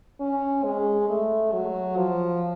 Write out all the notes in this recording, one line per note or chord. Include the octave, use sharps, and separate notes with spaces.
C#4
G#3
A3
F#3
F3